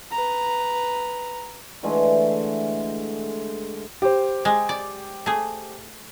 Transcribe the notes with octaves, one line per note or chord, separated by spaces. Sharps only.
B4 A#5
D3 E3 G#3 A3
G4 C5
G#3
D5
A3 G#4